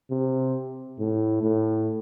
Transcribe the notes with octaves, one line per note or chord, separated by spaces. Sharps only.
C3
A2
A2